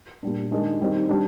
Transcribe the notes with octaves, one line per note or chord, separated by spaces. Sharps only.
A#2 G3 D4
D#3 G#3 D4
D#3 G3 C4 D#4
G3 D4